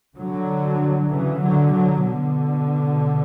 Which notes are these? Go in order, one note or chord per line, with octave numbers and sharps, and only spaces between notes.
D3 F#3
C#3 E3
D3 F#3
D3 F#3
B2 D3